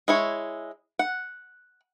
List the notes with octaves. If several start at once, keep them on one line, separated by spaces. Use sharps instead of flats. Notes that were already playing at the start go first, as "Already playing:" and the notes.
G#3 E4 C#5
F#5